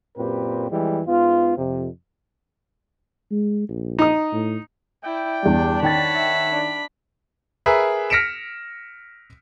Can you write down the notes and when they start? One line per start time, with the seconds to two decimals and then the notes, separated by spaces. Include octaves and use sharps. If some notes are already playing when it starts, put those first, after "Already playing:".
0.17 F#2 A#2 C4 G4 B4
0.70 F2 E3 G3 G#3
1.07 G#2 B3 F4
1.57 F2 C3
3.31 G#3
3.69 A#1
3.99 D#4 D#6
4.32 A2
5.04 E4 D5 G5
5.43 E2 G2 D4
5.82 D#3 C#5 F#5 G5 A5 B5 A6
6.15 E5
6.52 D4
7.66 G#4 A#4 B4 E5
8.10 F6 A#6 B6 C#7 D7 E7